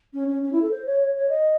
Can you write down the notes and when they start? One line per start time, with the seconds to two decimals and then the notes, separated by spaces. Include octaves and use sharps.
0.13 C#4
0.28 C#4
0.42 C#4
0.52 E4
0.62 A4
0.71 C5
0.85 C#5
1.00 C#5
1.14 C#5
1.29 D#5